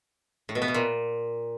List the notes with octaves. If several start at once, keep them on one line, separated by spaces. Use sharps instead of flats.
A2
B2
B3
B2
A#2